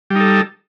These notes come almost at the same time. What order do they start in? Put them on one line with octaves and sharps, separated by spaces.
G3 D#4 A4